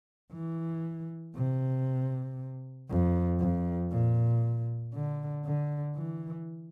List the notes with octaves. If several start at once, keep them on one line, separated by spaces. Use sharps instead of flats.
E3
C3
F2
F2
A#2
D3
D3
E3